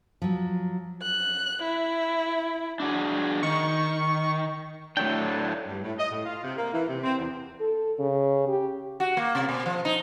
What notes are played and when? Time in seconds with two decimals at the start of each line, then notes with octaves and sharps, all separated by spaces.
0.22 F3 F#3
1.03 F#6
1.62 E4
2.80 D4 F#4 G#4
3.43 D#3 C#6
4.97 A2 F#3 A3 D4 G5
5.66 G2
5.84 A2
5.99 D#5
6.11 A2
6.25 F4
6.44 C3
6.57 A#3
6.73 E3
6.88 C3
7.04 C4
7.18 E2
7.60 A4
7.99 C#3
8.48 G4
9.00 F#4
9.17 A#3
9.35 C3
9.49 B2
9.66 F3
9.85 D#4